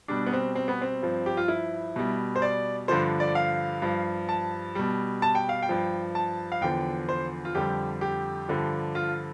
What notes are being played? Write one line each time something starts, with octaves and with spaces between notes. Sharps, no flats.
B2 G3 D4
B3
C4
C4
B3
C4
G2 F3
G4
F4
E4
B2 G3
C5
D5
G2 D3 F3 C5
D5
F5
G2 F3
A5
B2 G3
A5
G5
F5
G5
G2 F3
A5
F5
E2 D3 F3 G5
C5
F4
F2 D3 G3 G4
G4
G2 D3 F3
F4